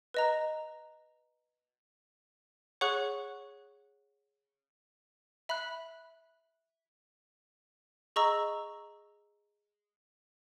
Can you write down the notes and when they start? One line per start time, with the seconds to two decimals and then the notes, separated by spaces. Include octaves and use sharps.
0.14 B4 D#5 A#5
2.81 G#4 C#5 F#5 C#6 F#6
5.49 E5 B5 F#6
8.16 G#4 D#5 A#5 C#6 E6